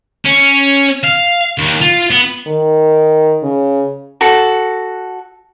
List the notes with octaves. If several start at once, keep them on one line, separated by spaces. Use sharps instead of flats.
C#4
F5
D#2
F4
B3
D#3
C#3
F#4 A4